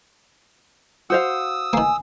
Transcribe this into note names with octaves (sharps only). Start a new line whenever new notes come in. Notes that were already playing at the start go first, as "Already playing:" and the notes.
F#4 C5 F5 D#6 E6
D#3 A#3 G#5